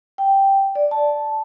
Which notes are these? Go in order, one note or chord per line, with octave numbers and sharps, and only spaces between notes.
G5
D5
A5